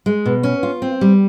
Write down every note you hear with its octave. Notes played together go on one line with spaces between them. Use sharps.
G#3
B2
C#4
F4
C4
G3